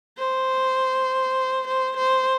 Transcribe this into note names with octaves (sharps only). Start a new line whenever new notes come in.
C5
C5
C5